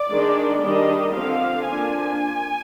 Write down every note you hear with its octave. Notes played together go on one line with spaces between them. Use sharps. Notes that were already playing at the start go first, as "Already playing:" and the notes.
Already playing: D5
D#3 G#3 D4
D#3 G3 D4 D#5
D3 F3 C4 F5
F3 A#3 D4 G#5